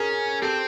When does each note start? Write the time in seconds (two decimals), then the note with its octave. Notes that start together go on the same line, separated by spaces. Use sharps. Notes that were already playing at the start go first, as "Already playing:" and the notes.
Already playing: C#4 G#4 A#4
0.42 C4 G4 A4